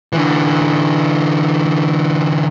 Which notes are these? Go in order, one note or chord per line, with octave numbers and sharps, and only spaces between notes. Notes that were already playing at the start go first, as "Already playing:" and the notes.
D3 E3